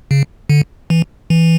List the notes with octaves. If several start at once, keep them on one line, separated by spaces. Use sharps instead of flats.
C#3
D3
E3
E3